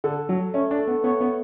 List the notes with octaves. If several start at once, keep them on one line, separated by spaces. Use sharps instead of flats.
D3 A4
F#3 A4
A3 C#4
D4
A4
B3
B3 C#5
B3